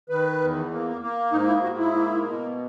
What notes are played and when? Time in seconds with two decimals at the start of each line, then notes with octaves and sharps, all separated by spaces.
0.09 D#3 B4
0.40 E2
0.71 A#3
1.01 A#3
1.31 G#2 D#4
1.47 E4
1.63 G#2 F#4
1.78 E4
1.93 A#3
2.24 B2